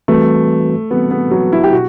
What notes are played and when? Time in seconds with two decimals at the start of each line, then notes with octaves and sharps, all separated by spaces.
0.08 E3 G3 A3 C4 F#4 B4
0.91 E3 G3 B3 C4 F#4 B4
1.11 B3
1.31 F#3
1.53 E4
1.64 G4
1.72 B2 B3 F#4